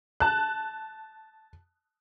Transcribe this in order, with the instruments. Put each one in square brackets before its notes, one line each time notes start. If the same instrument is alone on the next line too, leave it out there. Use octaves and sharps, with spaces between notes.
[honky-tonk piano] A5 F#6